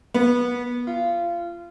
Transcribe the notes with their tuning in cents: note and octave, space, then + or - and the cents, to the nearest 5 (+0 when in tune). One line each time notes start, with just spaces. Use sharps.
B3 -20
F4 -25